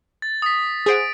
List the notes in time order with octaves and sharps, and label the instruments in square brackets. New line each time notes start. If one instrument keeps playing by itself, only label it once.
[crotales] A6
D#6 B6
[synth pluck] G#4 C5 F#5 [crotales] D#6 D7